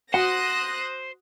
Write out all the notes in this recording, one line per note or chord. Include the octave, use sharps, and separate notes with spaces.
F#4 C5 F#5 D#6 F#6 A#6